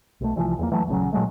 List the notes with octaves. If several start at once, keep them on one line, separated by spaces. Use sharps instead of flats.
B1 A3
C2 E3 F3
E2 G3 A#3
E3 F#3 A3
A#1 C#3 F#3
A#2 F#3 G#3 A3